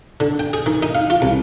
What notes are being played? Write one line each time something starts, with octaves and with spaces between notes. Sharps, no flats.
D3
G5
G#4
D#3
D#4
F5
F4
C2